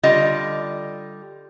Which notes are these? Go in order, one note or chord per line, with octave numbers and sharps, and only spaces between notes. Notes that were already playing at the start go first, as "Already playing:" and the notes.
D3 G3 F4 D#5